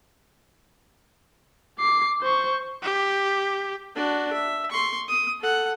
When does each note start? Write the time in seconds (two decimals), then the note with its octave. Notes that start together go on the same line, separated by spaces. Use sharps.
1.79 D6 C7
2.22 C5 C#6
2.83 G4
3.95 D4 F#4
4.33 E5
4.71 C6 C#6
5.08 D#6
5.40 A4 F#5